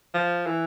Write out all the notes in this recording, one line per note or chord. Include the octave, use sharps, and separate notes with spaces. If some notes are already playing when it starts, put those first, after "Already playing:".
F3
E3